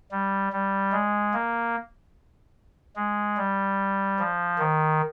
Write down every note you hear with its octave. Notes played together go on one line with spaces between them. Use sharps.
G3
G3
G#3
A#3
G#3
G3
F3
D#3